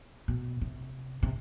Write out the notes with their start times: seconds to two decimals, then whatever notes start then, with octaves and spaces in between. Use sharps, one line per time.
0.28 B2
0.61 C3
1.23 C3